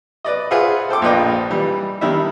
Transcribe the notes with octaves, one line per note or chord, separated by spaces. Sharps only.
B4 D5 D#5
F4 G#4 B4 C5 E5 F#5
A4 C5 G5 D6
A#1 A#2 B4 D5 D#5 G5
E3 G3
D#3 G3 D4 E4